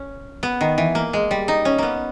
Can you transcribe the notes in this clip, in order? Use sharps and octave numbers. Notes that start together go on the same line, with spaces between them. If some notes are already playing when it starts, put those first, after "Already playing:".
Already playing: C#4
B3
D#3
E3
A#3
G#3
G3
D#4
C#4
A#3 B3